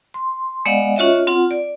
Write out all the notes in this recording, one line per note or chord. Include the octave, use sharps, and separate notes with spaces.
C6
G#3 B3 D5 D#5 F5 F#5
C#4 F4 F#4 C#5 D#5 E5
C4 F4 F#5
D5